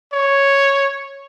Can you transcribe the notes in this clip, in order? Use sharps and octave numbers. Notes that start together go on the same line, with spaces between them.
C#5